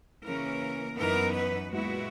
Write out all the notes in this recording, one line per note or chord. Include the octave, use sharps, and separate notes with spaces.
C#3 E3 A#3 C#4 A#4
F#2 E3 B3 D#4 A#4
B4
A#2 G#3 B3 E4 F#4